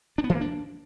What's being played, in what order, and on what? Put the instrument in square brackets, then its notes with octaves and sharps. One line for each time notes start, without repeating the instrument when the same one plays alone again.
[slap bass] D4
B3
E3
A#3
D4